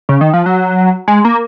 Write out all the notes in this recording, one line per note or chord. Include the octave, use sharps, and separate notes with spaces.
C#3
D#3
F3
F#3
G#3
A#3